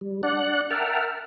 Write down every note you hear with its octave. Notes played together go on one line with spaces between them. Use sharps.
G3
D4 D5 F#5 F#6
A#4 E5 F#5 G5 A5 F6